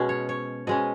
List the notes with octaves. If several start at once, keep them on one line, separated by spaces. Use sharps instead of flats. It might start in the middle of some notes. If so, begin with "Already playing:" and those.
Already playing: B2 G#3 C#4 G#4
C#5
C#5
B2 G#3 C#4 D#5